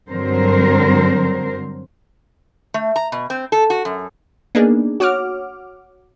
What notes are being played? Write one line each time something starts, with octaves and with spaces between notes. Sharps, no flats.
G2 D3 F#3 C4 A#4 C5
A3
A#5
B2
C4
A4
F#4
F#2
A#3 B3 D4 D#4 G#4
F#4 C#5 F#5 D6 F6